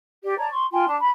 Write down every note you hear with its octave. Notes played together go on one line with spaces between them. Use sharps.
G4 D5
C#5 D5 A5 A#5
C6 C#6
F4 G5 G#5 C6
D4 A5
B5